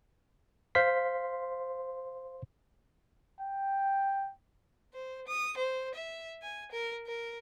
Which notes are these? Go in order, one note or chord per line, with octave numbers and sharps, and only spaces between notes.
C5 F5 C6 B6
G5
C5
D#6
C5
E5
G#5
A#4
A#4